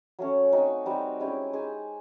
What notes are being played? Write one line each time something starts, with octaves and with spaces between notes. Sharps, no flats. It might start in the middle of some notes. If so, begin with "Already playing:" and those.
F#3 A3 C#4
A3 C4 D#4 F#4
G3 C4 D#4 F#4
G#3 C#4 E4 G4
D#4 G#4 C5